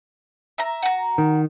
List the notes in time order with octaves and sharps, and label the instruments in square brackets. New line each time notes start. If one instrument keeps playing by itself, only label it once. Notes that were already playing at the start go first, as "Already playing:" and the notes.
[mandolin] E5 A#5
F#4 A#5
[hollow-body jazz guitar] D#3